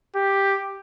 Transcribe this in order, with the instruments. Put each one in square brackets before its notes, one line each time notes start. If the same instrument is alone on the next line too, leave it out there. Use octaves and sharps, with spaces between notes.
[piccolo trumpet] G4